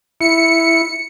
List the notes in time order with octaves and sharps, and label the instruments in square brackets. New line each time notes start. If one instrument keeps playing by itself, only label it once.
[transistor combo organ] E4 [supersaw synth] C#7